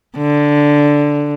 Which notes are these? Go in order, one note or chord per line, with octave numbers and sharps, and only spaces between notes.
D3